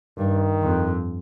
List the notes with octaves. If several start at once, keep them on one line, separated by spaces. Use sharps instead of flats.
G2 D#3
F2